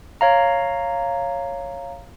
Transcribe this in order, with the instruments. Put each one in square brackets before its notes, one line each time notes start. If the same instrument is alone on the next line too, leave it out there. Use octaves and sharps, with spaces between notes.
[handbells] C#5 F5 A#5